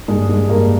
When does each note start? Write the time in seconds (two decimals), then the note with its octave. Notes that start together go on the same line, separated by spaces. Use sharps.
0.08 G2 G#3
0.29 G#3
0.49 G2 A#3